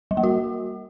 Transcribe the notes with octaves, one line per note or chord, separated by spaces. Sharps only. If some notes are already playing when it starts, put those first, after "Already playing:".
G3
A#3
F#4